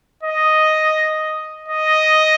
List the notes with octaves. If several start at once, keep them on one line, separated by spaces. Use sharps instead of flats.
D#5
D#5